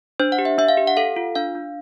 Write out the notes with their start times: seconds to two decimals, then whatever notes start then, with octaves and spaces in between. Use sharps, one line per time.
0.20 D4 C5
0.32 F#5
0.39 G4
0.45 E5
0.58 D4 E5
0.69 F5
0.77 G4
0.87 F#5
0.97 A4 F5
1.16 F4
1.35 D4 F5
1.55 D4